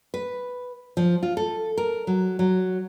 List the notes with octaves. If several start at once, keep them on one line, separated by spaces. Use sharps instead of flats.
B4
F3
F4
A4
A#4
F#3
F#3